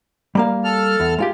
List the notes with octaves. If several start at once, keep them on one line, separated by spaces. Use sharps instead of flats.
G3 A#3 F5
A4 F6
E2
G#3 F4 G4